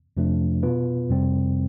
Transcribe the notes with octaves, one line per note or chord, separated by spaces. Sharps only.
F2 C3 F3 A3 D4
B2 B3 F4 B4
F2 C3 G3 C4